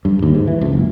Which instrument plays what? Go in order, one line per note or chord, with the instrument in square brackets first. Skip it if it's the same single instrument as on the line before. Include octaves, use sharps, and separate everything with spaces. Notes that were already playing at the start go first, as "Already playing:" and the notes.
[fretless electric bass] G2
D#2
G#2
E3
C#2
F#1